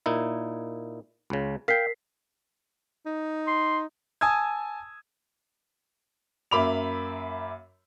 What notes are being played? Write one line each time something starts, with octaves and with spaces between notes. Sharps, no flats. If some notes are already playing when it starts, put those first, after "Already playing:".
A#2 D#4 E4
C#2 C#3
A#4 F5 G5 B6 C7
D#4
C6
G#5 A5 D#6 E6 G#6
F#2 A#3 E5 B5 D6 F7